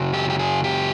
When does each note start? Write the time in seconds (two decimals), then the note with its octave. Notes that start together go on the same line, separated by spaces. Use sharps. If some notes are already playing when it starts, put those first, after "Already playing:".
Already playing: F#2 C#3 F#3
0.14 G4
0.30 G4
0.39 G#4
0.64 G4